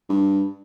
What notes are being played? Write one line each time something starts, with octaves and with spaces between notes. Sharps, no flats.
G2